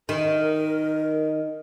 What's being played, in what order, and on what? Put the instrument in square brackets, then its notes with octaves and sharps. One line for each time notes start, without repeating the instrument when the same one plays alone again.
[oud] D#3 [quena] A#4